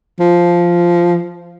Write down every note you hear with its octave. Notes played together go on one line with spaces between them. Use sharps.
F3